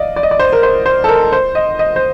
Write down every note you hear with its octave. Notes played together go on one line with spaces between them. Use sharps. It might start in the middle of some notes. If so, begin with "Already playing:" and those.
Already playing: D5 D#5 F5
D5
D#5
D5
C5
A#4
C5
C5
A4
A#4
C5
D#5
D#5
C5